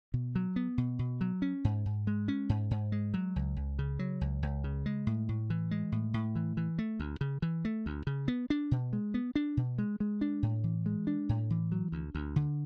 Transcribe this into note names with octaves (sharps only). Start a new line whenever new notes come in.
B2
F#3
B3
B2
B2
F#3
C#4
G#2
G#2
G#3
C#4
G#2
G#2
G#3
F#3
C#2
C#2
C#3
F#3
C#2
C#2
C#3
G#3
A2
A2
E3
G#3
A2
A2
E3
E3
A3
D2
C#3
E3
A3
D2
C#3
B3
D4
B2
G#3
B3
D4
B2
G#3
G#3
D4
A2
E3
G#3
D4
A2
E3
F#3
D2
D2
D3